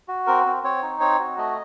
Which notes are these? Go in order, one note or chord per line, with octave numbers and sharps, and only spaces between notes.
F#4
C4 A#4
C4
C4 C#5
D#4
C4 C#5
F#4
A3 D#5